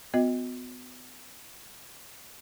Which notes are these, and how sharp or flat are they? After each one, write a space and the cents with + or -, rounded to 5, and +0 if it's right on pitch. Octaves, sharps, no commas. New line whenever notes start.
B3 +30 F#4 -30 D#5 +15